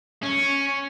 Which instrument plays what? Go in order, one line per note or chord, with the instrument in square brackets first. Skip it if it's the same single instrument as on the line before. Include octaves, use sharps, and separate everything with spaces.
[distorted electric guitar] C#4